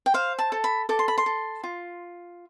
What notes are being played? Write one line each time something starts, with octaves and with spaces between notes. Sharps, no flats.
G5
C5 F5
A5
A4
B5
A4 D6
C6
B5
C6
A4
F4